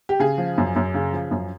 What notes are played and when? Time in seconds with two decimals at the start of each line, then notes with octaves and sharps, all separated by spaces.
0.09 G4
0.20 C#3 G#4
0.38 F3
0.58 F#2
0.76 F#2
0.94 C#3
1.13 F3
1.31 F#2